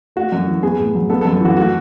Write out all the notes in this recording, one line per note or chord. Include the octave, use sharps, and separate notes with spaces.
A3 F#4
F#2
E3
B3 G#4
A2
F#3
B3 A4
A4
F#2
E3 F#4
A3 F#4